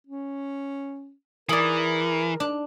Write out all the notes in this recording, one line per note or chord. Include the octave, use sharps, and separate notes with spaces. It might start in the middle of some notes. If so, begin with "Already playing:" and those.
C#4
E3 G#4 A#4 D5
D4